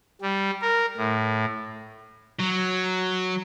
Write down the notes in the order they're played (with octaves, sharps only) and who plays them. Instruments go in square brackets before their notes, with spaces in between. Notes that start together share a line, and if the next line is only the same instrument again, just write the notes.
[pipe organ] G3
A#4
A2
[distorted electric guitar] F#3